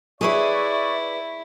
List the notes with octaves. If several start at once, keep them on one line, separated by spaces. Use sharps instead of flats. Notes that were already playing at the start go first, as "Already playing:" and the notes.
E4 G#4 B4 C#5 D5 E5 C#6